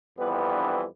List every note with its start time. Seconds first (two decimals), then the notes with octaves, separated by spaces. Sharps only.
0.18 F2 E3 G3 B3 B4
0.52 D4